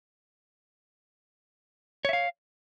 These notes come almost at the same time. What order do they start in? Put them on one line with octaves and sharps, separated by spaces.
C#5 E5 F5